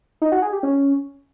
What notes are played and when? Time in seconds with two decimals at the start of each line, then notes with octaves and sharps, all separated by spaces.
0.22 D#4
0.32 F#4
0.42 G#4
0.53 G4
0.63 C#4